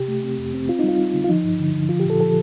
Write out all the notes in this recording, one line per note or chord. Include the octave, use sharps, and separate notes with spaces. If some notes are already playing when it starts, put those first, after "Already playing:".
Already playing: C3 G4
A3
C4
F2
C4
C4 F4
D#4
G3
F4
G3
D3
F4
F3 D#4
G2
D3
D3
F3 F4
G4
A#2
A4
F3 A4